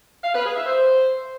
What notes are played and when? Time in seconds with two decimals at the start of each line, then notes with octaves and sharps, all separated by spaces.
0.24 F5
0.35 B4
0.45 G#4
0.56 E5
0.67 C5